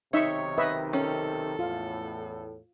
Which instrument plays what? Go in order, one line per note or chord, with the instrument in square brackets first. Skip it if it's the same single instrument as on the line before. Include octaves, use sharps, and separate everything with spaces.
[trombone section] B1 C3 D#3 [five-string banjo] D#4 [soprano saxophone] C#5 [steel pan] E5 C#6
[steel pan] B4 D#5 E5
[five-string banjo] C#4 [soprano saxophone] A4
[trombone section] E2 A2 [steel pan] F4